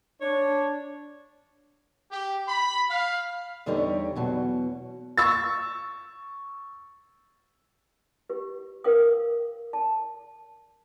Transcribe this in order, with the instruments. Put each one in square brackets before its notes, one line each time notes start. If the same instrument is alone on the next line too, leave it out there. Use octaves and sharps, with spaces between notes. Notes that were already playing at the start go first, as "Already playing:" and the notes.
[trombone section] D4 [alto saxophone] C#5
[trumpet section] G4
B5
F5
[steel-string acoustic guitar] E2 D3 G3 D#4 G4 C#5
E2 B2 F#3
[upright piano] C#6 E6 A6
[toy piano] G4 B4
A#4 B4 F5 G5 D#6
A5